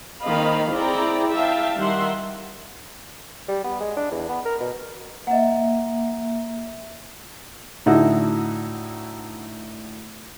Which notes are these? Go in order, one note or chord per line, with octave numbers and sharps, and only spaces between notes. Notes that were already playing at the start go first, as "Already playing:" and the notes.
D#3 A#3 C4 D#5 F5 B5
C4 E4 G#4 D5 G5 A#5
E5 F5 G5 A5
D#3 G3 E5 F#5 C6
G3
B3
G#3
D4
E2
B3
A#4
B2
A#3 D#5 E5 F#5
A2 D3 D#4 E4 F#4